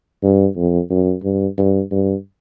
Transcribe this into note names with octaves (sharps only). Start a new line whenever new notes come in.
G2
F2
F#2
G2
G2
G2